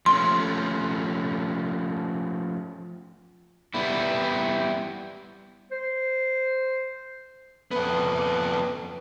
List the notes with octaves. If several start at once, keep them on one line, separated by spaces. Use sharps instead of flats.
F3 A3 C#4 C6
G3 B3 E4
C5
F2 B3